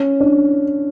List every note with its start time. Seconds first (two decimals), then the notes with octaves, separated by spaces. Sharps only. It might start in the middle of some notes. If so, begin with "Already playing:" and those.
Already playing: C#4
0.20 D4